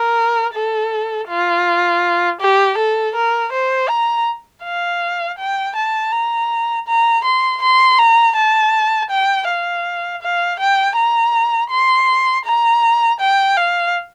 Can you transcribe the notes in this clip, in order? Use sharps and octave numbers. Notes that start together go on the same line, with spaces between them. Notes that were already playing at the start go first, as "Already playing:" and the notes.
Already playing: A#4
A4
F4
G4
A4
A#4
C5
A#5
F5
G5
A5
A#5
A#5
C6
C6
A#5
A5
G5
F5
F5
G5
A#5
C6
A#5
G5
F5